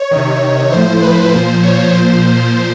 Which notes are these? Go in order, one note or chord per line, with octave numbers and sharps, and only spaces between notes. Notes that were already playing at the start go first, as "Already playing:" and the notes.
Already playing: C#5
C3 D#3
A2 F3 C5
B4
A#2 F3 C5
C#5
A#2 F3 C5